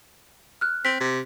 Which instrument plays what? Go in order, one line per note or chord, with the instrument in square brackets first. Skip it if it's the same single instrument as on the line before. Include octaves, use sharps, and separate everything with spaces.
[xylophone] F6 F#6
[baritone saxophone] C4 [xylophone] B6
[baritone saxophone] C3